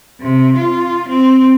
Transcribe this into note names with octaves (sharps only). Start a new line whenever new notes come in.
C3
F4
C4